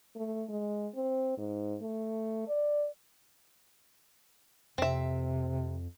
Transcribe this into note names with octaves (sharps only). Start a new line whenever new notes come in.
A3
G#3
C4
G#2
A3
D5
F2 C3 C4 E5